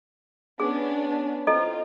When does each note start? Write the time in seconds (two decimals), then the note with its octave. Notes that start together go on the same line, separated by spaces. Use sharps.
0.60 B3 C#4 D4 G#4
1.47 C4 E4 F4 A4 D#5